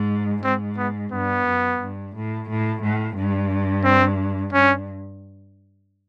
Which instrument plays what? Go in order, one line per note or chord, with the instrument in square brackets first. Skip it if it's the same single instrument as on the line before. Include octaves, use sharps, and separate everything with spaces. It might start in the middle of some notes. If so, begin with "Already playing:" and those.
Already playing: [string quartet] G#2
[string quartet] G#2 [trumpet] C4
[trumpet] B3
[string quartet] G2 [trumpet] B3
[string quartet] F#2
G2
A2
A2
A2
G2
[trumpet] C4
[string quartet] G2 [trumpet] C#4